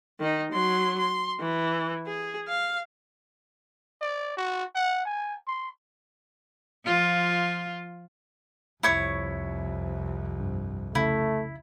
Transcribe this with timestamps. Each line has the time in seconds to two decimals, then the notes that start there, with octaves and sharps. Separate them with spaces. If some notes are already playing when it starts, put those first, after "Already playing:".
0.20 D#3 D#4
0.52 F#3 C6
0.99 C6
1.40 E3
2.06 G#4
2.48 F5
4.01 D5
4.37 F#4
4.75 F#5
5.05 G#5
5.47 C6
6.84 F3 F4
8.83 C2 F2 E4 C#5 C#6
10.40 G2
10.95 C#3 A3 C#4 E4